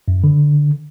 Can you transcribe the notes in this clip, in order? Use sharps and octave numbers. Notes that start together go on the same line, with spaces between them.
F#2
D3